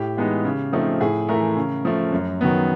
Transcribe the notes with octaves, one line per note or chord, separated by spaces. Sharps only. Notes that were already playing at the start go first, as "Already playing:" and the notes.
Already playing: A2 G4
E3 G#3 B3 D#4
C#3
F3 A3 C4 D#4
A2 G#4
E3 A3 A#4
C#3
F3 A3
F#2
D#3 F#3 B3